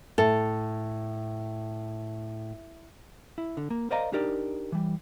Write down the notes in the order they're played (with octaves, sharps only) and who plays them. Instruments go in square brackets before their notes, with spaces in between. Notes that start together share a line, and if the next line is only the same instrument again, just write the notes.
[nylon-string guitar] A2 [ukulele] A4
[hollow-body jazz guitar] E4
D3
A#3
A#4 C5 D5 D#5 F5 A#5
D4 D#4 G4 A#4 D5
E3 G3